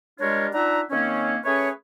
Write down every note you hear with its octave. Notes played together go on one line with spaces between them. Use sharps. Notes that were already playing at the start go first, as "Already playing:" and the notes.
G3 G#3 D4 F4 A#4 C#5
D4 D#4 F4 E5 F#5 A#5
D#3 A#3 C4 C#4
A3 C#4 G#4 B4 C#5